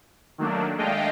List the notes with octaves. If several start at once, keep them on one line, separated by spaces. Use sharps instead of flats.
D#3 F#3 A3 A#3 D4
G#3 A3 D4 D#5 F5 G5